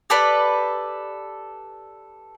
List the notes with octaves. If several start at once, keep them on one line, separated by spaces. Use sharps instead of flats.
G4 A4 B4 D5